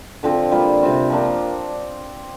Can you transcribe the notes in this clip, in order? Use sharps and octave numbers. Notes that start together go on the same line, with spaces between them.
D3 F3 C4
G3 A#3 F4
C3 G3 C4 F4
F3 A#3 D4